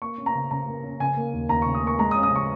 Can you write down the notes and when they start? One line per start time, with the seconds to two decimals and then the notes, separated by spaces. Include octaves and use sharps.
0.02 A#3 C#6
0.18 C#4
0.26 A#5
0.35 C#3
0.51 C#3 A#5
0.67 A#3
0.84 C#4
1.00 C#3 G#5
1.17 A#3
1.33 D#2
1.49 D#2 A#5
1.62 C#3 C#6
1.74 D#6
1.83 A#3 C#6
1.99 G#3 A#5
2.11 D#6
2.16 C#4
2.23 D#6
2.32 C#3 C#6